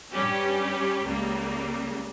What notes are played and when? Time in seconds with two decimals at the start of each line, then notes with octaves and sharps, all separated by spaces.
0.11 G2 G3 C#4 G4
1.04 C#2 C#3 G3 A#3